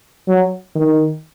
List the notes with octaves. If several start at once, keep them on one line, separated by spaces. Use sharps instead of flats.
F#3
D#3